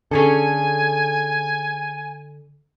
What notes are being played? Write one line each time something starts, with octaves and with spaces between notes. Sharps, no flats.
D3 C#4 G#4 A4 G#5